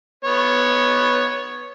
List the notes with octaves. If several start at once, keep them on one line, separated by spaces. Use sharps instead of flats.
B3 C#5